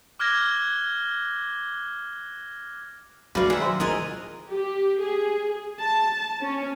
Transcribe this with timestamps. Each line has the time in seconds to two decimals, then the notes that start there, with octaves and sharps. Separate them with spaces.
0.19 D6 F6 F#6 G#6 A#6 G7
3.35 G2 F#3 A3 A#3 F#4 B4 D5 F5
3.50 D#3 G#4 E5 F#5
3.62 C5
3.80 E3 F4 G#4 A#4 D#5 G#5
4.48 G4
5.01 G#4
5.80 A5
6.41 C#4